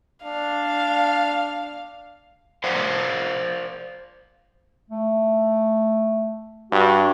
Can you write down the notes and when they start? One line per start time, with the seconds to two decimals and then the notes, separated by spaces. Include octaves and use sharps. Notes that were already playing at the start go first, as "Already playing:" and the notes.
0.23 D4 F5
2.64 C5 D5 F5 F#5
4.90 A3
6.72 G2 F#4